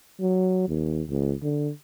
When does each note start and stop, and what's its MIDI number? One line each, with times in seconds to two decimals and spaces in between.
0.21 0.66 54
0.68 1.02 39
1.10 1.34 37
1.42 1.71 50